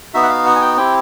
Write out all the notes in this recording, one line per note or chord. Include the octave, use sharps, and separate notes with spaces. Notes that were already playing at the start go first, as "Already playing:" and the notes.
B3 D#4 F#4 E5
F#5
F5
F#5
G#5
G5
C4 E4 G4 G5